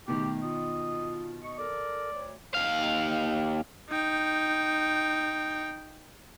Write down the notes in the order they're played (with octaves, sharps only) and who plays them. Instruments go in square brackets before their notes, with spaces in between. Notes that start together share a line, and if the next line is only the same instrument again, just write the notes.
[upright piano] B2 D#3 [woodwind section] A3 [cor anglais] G4
[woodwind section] F4 [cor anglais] D#5
[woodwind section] D#5 C#6
[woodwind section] A4 A#4 [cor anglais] D5
[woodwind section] D2 C#5
[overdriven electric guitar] D#2 F5
[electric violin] D#4 G5